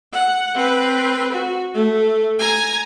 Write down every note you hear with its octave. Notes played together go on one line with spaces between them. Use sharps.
F#5
C4 B4
F#4
A3
G#5 A#5